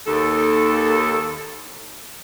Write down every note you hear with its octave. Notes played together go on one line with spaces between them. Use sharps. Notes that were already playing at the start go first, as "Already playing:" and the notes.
D#2 A4